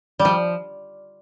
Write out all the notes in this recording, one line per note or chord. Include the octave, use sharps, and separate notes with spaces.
G3
F3